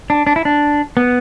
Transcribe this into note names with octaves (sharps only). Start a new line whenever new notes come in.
D4
D4
E4
D4
B3